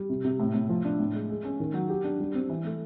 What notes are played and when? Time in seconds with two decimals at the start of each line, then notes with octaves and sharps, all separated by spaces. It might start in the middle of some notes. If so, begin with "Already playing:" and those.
Already playing: G3
0.10 C3
0.24 C3
0.40 A2
0.54 A2
0.69 F3
0.84 D4
0.99 A2
1.14 G#3
1.30 G#3
1.45 C#4
1.60 D#3
1.74 F#3
1.89 G4
2.04 D4
2.20 G3
2.34 C4
2.49 E3
2.65 A3